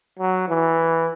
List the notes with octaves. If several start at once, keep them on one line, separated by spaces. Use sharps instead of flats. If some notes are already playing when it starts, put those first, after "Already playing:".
F#3
E3